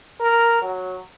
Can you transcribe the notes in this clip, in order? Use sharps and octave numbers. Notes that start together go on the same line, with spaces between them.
A#4
F#3